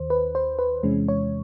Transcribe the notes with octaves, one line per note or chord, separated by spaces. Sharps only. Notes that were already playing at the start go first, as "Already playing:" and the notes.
Already playing: D#2 D#3 C5
B4
C5
B4
E2 C3 E3 G#3 C#4
C#5